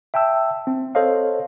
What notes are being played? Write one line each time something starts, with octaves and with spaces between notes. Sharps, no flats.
E5 G5 A5 E6
C4
A4 C5 C#5 D#5 F5